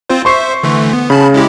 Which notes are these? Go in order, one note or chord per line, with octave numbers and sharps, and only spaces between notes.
C4 F4 C5
C5 E5 C6 C#6 C7
D3 E3 A3
B3
C#3 A5 B5
G#3 E4 G4